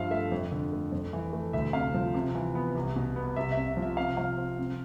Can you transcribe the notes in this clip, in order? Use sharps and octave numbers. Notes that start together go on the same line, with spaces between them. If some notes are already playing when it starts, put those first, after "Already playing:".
Already playing: G2 F3 E5 F5
A3 E5
F2
D3
A3
F2
E3
A3
D2 E5
C3 F5
F3
C3
E3
B3
C2
B2
B3
C2 E5
E5
C3
E5
F3
E5
C3 F5
F3 F5
C4
C3